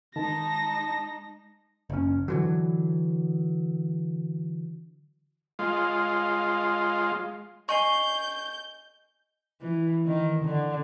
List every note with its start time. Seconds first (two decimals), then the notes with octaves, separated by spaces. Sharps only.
0.16 D#3 G#3 D#4 A5 A#6
1.90 F#1 C#4
2.28 D3 E3 F#3
5.59 G#3 F4
7.69 D#5 G#5 C#6 G6 C7
9.61 E3
10.06 D#3
10.44 D3